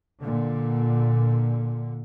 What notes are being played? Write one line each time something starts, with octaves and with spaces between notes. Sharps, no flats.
A#2 D3